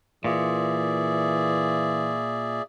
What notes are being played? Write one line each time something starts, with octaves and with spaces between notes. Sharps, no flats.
A#2 E3 G#4 D5 E5